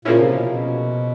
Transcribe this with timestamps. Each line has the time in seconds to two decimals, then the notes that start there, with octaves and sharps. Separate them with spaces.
0.05 A#2 C#3 F3 A#3 C#4 E4
0.19 C3
0.32 B2
0.42 A#2
0.47 B2